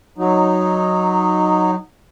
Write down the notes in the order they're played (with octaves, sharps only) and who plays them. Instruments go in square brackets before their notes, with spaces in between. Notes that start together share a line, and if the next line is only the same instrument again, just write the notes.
[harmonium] F#3 D#4